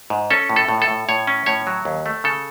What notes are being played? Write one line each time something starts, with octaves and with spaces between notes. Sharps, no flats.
G#2
C#4 A4
A2
A4
A2
A4
A2
A2 C#5
C#4
A2 C#5
F#3
D#2
A3
C#3 A4